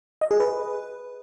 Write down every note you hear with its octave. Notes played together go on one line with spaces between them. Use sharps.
D#5
G#4
B4